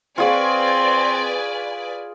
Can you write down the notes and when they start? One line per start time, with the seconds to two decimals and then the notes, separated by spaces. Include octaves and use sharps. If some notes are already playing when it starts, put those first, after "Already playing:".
0.18 C4 F4 G#4 B4 C#5 D5 G#5